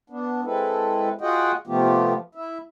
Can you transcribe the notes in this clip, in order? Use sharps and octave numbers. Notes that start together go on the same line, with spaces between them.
B3 D4
G#3 C4 E4 A4 B4
F4 F#4 G#4 D#5 F#5 G5
C3 F3 A3 B3 F4 G4
E4 E5